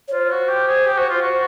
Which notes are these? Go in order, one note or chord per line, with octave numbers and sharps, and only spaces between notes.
C#5
F4 C5
F#4
G4
G#4
G4
F#4
F4
F#4